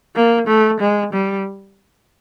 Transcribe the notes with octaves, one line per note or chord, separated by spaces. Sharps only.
A#3
A3
G#3
G3